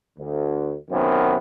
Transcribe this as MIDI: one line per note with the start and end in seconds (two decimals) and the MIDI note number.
0.18 0.76 38
0.91 1.38 42
0.91 1.38 48
0.91 1.38 51
0.91 1.38 59